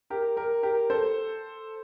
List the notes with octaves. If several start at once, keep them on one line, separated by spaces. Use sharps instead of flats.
G4 A#4
G4 A#4
G4 A#4
A4 C5